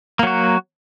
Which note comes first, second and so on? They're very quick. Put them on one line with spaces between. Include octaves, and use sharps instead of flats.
A#3 F#3 F#4